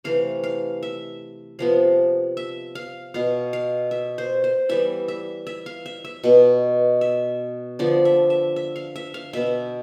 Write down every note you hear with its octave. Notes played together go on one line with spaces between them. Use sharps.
C3 E3 A3 F5
F5
E5
C3 F3 B3 F5
E5
F5
B2 B3 F5
F5
E5
C5
C5
E3 G3 B3 E5
E5
E5
F5
E5
E5
B2 B3
E5
D3 F3 B3 D5
E5
E5
E5
F5
E5
F5
B2 B3 E5